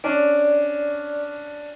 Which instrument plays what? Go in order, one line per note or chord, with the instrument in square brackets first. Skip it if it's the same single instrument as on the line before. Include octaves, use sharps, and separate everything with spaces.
[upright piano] C#4 D4 [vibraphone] D5